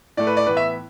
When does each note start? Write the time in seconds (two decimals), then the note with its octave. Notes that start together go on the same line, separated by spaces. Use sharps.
0.17 A2 A3 D5
0.27 B4
0.37 D5
0.47 A2 E3 B3 B4
0.57 E5